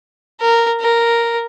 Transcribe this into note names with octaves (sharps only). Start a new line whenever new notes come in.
A#4
A#4